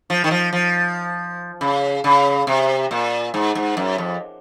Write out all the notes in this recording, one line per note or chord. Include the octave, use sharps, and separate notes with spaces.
F3
D#3
F3
F3
C#3
C#3
C3
A#2
G#2
G#2
F#2
F2